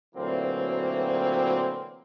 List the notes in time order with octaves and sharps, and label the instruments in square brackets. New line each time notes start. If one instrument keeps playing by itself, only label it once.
[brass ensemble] D2 A#2 E3 F#3 A#3 C4